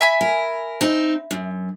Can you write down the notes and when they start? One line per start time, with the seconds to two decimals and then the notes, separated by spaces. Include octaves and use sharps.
0.01 E5 G#5 B5
0.21 A#4
0.81 C4 D#4
1.31 F#2